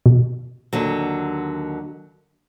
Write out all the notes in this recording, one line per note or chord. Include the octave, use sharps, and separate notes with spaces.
B2
D#2 D3 F#3